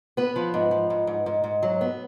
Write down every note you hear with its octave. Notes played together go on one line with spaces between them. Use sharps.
B3 B4
F3
G#2
F3
G#2
G#2
G#2
G#2
F#3
B3